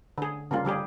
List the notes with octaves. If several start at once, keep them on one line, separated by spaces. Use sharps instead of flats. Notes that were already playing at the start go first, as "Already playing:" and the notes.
D3 G#4
C#3 G3 A#3 F4
D3 G3 G4 G#4